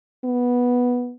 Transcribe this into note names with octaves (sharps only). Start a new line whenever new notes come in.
B3